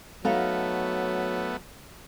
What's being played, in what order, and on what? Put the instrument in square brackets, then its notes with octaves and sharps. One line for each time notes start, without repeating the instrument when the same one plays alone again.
[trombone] F#3 [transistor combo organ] A3 B3 [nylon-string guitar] D#4 A4 F5